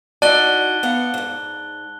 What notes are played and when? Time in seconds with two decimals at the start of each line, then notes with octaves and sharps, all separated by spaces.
0.22 D#4 E4 F#4 D5 A5 F#6 G7
0.83 B3 F5 F#5
1.14 D2 G#2